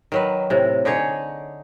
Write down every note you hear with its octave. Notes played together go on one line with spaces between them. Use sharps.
D#3 F#3 B4
A2 C3
D3 D#4 G#4 C#5